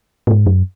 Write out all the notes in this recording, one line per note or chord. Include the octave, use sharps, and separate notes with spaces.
A2
G#2
F#2